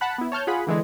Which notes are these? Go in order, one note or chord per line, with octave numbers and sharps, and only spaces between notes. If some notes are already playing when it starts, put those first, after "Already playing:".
F#5 A5 B5 F#6
B3 E4
C#5 A5 F6 G6
F4 G#4 F#5 B5
D3 E3 G#3